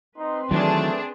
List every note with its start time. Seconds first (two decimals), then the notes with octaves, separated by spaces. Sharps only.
0.18 C4 D#4 B4 C6
0.51 D#3 E3 F#3 A3 D4 G#4